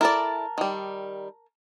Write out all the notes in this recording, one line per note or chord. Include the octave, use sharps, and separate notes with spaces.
E4 A4 A#4 D5 A5
D#3 G3